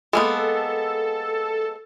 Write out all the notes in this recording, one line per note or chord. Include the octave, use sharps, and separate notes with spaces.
G#3 A#3 B3 A4